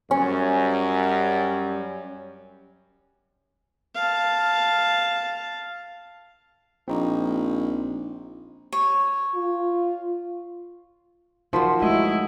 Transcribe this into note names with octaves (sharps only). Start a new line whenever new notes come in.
F#2 G3 C#4
F5 A5
A#1 C4 D#4
C#5
F4
F3 F#3 D#4 A#4 C5 B5 C6
G#3 A3 E4 F#4 D#5